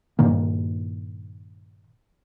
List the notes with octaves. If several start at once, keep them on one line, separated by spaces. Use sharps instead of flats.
G2 A#2 D#3 A#3